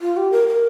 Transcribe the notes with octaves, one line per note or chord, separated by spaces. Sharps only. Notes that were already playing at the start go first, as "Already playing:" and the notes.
F4
G4
A#4
A#4